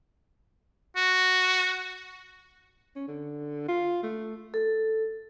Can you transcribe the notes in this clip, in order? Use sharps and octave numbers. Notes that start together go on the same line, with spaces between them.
F#4
C#4
D3
F4
A3
A4